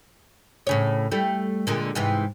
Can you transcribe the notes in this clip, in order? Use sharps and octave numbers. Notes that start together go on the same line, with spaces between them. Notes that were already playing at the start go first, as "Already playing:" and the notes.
A2 C#3 C#5
G3 A3 E4
A#2 D3 G#3
G#2 C3 E3